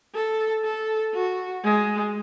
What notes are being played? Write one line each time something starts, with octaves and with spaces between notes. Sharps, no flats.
A4
A4
F#4
G#3